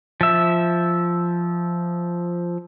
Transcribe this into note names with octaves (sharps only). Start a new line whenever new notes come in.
F3 E5